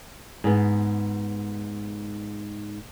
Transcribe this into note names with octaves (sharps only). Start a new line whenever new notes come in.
G#2 B3